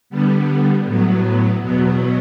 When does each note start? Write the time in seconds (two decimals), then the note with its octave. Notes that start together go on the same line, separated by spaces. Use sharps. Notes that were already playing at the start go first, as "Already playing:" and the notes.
0.10 D3 G3 B3
0.85 A2 F#3 B3
1.60 E2 B2 F#3 B3